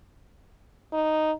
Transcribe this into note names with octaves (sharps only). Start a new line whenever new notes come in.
D#4